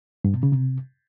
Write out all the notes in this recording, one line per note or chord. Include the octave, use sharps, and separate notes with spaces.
G2
B2
C#3
C3